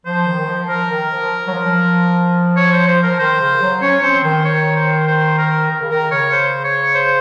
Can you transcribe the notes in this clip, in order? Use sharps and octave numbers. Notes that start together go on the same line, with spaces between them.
F3 C5
D#3
D#3
F3
F3 A#4
D#3
F3
F#3
F3
F3
C#5
C5
C5
A#4
F3
D#3 C5
C#3
F#3
C#4 C#5
C4 C5
F3
D#3 C5
C#5
C5
C5
A#4
D#3
C#3
D#3 A#4
C#3 C#5
C5
C#5
C5